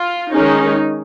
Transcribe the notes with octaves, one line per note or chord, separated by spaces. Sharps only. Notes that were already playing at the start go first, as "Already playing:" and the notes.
Already playing: F4
D#3 G#3 C#4 D#4